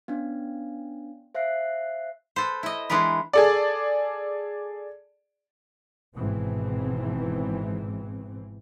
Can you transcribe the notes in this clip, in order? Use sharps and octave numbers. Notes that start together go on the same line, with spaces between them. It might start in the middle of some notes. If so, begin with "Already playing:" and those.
B3 C#4 D4
C5 E5 F5 F#6 C7
A4 B4 C5
E4 D#5
E3 G#3 D4 A#4 B4
G#4 A4 D5
G#1 G#2 B2 E3 C4